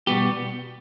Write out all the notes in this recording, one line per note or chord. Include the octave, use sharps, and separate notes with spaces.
B2 G3 B3 G4